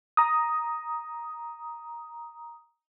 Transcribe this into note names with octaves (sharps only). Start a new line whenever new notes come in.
A#5 D#6